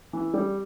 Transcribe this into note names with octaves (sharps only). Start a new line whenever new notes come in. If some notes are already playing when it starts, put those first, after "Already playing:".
E3
G3